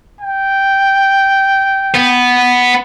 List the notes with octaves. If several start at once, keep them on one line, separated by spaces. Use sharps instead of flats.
G5
B3